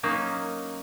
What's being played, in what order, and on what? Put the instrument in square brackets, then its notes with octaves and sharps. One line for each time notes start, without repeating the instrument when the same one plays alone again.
[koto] F#3 A#3 C#4 D#4